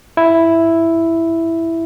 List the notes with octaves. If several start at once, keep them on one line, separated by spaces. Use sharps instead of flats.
E4